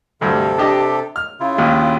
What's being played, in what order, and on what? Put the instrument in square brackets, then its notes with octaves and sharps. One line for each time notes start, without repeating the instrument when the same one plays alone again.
[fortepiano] D2 G2 [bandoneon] C3 A4
[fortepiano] D4 G4 D#5
F6
[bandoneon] C#3 E4 F4
[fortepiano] A#1 D#2